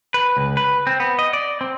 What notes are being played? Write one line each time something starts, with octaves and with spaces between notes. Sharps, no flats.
B4
C#2
B4
C4
B3
D#5
D5
C4